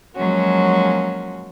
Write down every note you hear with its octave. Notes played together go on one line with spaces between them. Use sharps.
F3 F#3 G#3 A#3 C#4 F#4